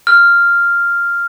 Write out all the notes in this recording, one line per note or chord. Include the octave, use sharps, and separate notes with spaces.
F6